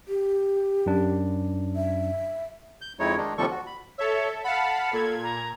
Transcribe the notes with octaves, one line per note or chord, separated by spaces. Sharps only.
G4
F#2 D4
E5
G6
F2 G#3 D#4 E4 C#5
D#3 G#3 D4 D#4
D#2 C3 F3 G3 A4 C#6
F#4
B5
A4 C#5 E5
F5 F#5 A5 B5
A#2 A4 G#6
A#5